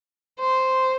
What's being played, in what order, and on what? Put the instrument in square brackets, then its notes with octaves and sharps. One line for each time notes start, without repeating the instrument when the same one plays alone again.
[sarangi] C5